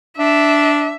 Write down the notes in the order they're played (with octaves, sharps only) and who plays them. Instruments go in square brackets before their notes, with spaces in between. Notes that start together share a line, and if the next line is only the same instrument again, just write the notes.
[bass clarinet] D4 [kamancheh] E5